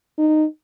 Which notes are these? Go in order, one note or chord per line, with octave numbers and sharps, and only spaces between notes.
D#4